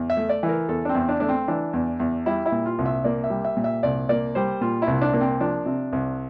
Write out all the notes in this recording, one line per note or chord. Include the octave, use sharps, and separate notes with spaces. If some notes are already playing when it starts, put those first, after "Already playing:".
Already playing: E2
E5
A3
D5
E3
A#4
E2 A4
D4
C4
E2
D4
A3 D4
C4
E3 D4
E2
E2
G3 E4
E4
A#2
F4
C2
E5
A#3 D5
E5
G3
E5
A#2
E5
C2 D5
A#3 D5
G3 C5
A#2 F4
E4
C2
D4
A#3
C4
F3 D4
C3
C2